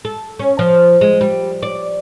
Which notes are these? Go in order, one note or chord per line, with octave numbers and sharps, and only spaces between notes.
A4
C#4
F3
G#3
G3
D5